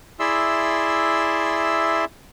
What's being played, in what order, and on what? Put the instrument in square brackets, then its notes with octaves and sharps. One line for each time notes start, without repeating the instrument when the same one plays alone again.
[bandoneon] E4 G#4 D5 E5 C6 E6